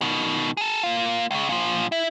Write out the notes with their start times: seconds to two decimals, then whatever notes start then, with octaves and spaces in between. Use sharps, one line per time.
0.01 B2 D#3
0.57 G#4 A4
0.83 A#3 F4
1.31 C#2 C#3
1.49 A#2 F3
1.92 E4